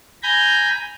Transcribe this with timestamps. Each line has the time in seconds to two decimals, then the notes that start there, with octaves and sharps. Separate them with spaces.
0.23 G#5 A#5 B5 G6